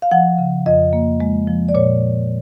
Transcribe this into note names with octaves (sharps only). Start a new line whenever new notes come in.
F5
F3 F#5
C#3
F2 D#5
A#3
G#3
F3
D5
A#2 C#5